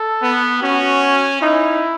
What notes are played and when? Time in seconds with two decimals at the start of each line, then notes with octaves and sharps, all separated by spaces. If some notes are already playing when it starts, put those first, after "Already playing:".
Already playing: A4
0.21 B3
0.61 C#4 F#4
1.41 D#4 E4